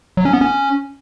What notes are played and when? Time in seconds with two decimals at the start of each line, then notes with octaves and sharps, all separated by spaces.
0.17 F#3
0.25 C#4
0.33 B3
0.41 C#4